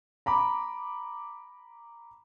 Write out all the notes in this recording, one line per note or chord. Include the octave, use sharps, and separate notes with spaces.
A#5 B5 D6